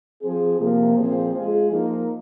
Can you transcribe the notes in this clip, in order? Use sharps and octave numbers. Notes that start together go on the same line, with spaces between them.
F3 C4 G#4
C3 F3 A#3
A#2 F3 C4 F4 G#4
G#3 F4 G#4
F3 A#3 D#4 A#4